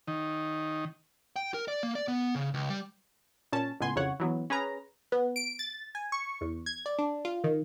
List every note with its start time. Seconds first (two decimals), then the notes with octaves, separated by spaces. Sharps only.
0.08 D#3
1.36 G5
1.54 A#4
1.68 D5
1.83 A#3
1.95 D5
2.08 B3
2.35 C#3
2.54 C#2
2.69 G3
3.53 A#2 C#4 A5
3.80 C#2 A2 B3 G#5 C6
3.95 C2 F2 C#3 C#5 F#5
4.20 E3 F#3 B3
4.50 C#4 G#4 B4 A#5
5.12 B3
5.36 D7
5.59 A6
5.95 G#5
6.12 C#6
6.41 E2
6.66 G#6
6.86 D5
6.99 D4
7.25 F4
7.44 D#3